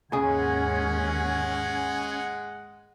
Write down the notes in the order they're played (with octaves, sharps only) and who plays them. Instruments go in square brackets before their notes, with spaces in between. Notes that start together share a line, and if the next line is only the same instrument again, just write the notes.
[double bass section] D#2 G#2 [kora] C#3 G#4 [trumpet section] G#3 F#5 [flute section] C#4 G#6